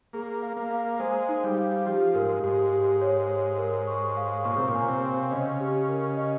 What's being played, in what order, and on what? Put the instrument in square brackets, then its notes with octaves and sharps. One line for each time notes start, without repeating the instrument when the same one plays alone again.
[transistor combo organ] A#3 [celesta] G#4
[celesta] F5
[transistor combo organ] A#3
[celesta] F5
[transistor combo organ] G#3 [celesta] C5
[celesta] D#4
[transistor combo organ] G3
[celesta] F5
[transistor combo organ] F3 [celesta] G4
[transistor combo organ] G#2 [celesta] A#4
[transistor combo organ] G#2 [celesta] G4
[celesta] G4
C#5
C#5
A#4
C#6
F5
[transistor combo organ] A#2 [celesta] C#6
[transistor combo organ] C3
A#2
[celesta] G#5
[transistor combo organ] C3
[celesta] F5
[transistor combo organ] C#3 [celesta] D#5
[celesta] G4
A#4
D#5